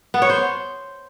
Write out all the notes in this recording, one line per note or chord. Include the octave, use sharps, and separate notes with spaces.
B3
C#5
C5